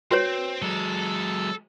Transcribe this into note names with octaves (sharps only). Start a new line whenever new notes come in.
C4 F#4 B4 C#5
F#3 G#3 A4